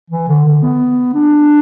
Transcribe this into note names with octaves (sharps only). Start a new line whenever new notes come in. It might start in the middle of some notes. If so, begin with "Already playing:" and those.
E3
D3
D3
B3
D4